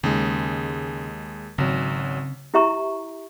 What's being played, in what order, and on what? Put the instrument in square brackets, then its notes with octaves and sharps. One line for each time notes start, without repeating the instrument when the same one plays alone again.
[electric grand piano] D#2 G#3 [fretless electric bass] C#3
[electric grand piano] G#1 F#3 [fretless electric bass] C#3 C4
[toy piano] E4 G4 E5 A#5 C#6